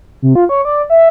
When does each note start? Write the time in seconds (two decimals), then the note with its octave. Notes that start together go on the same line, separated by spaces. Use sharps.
0.22 C3
0.35 F4
0.49 C#5
0.65 D5
0.90 E5